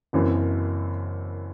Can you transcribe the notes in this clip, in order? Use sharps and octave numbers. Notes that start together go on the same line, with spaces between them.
F#1 F#2 E3 C4 E4